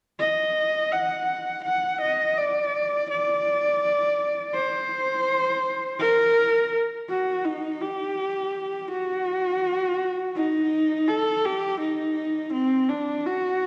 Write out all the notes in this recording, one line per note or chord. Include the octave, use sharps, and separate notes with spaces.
D#5
F#5
F#5
D#5
D5
D5
C5
A#4
F#4
D#4
G4
F#4
D#4
A4
G4
D#4
C4
D4
F#4